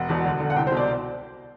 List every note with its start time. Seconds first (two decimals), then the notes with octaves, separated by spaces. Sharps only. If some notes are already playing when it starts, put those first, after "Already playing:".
Already playing: E1 F#5
0.09 E2 B2
0.24 D2
0.40 D3
0.50 F#5
0.56 C2 G5
0.67 B2 C5
0.77 D5